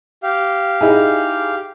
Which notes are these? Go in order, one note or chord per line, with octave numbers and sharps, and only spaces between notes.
G4 F5
D#4 E4 G#4